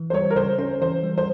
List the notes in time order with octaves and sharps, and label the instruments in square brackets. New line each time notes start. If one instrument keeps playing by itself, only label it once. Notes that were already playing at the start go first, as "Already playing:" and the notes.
Already playing: [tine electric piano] E3
[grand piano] C5
[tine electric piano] G3 [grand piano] C#5
[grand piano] A#4
[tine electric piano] C#3 [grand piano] C5
[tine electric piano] C#4 [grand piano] C5
[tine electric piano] E3 [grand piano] C5
[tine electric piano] G3
[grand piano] C5